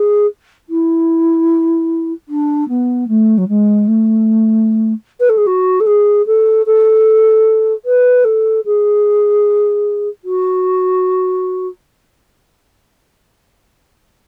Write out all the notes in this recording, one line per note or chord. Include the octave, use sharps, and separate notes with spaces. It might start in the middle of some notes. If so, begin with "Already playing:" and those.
Already playing: G#4
E4
D4
B3
A3
F#3
G#3
A3
B4
A4
G#4
F#4
A4
G#4
A4
A4
B4
A4
G#4
F#4